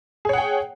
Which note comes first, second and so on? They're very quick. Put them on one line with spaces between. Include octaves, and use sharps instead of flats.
G#4 C#5 F#5 G5